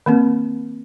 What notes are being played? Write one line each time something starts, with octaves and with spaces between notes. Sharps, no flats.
D#3 A#3 C4